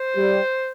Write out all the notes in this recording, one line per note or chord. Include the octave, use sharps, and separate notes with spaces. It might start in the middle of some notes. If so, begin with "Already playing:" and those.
Already playing: C5
G3